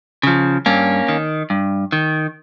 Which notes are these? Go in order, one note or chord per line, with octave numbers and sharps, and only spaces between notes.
C#3 F3
G2 A#3 C#4
D#3
G2
D#3